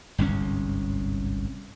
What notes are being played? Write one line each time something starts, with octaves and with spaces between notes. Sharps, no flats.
G1 C2 G#2 C#4